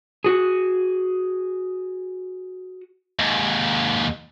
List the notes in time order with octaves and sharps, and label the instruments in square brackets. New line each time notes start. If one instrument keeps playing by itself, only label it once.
[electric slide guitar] F#4 G#4
[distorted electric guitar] D#2 G#2